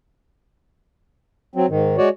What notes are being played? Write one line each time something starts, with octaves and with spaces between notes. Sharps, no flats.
F#3 C4
G#2 D#3
G#3 F#4 C#5 D5